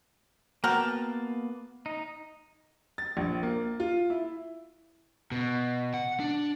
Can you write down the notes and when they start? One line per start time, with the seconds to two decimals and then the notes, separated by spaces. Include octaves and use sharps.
0.64 A#3 B3 F#4 A#4 G5 A5
1.86 D#4
2.98 A6
3.17 A#1
3.43 A#3
3.80 F4
4.10 E4
5.32 B2
5.94 F#5
6.20 D4